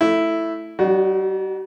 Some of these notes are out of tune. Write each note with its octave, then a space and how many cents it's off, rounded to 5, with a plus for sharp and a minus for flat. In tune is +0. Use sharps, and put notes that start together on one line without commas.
A3 +0 E4 +0
G3 -45 D4 +45 F#4 +0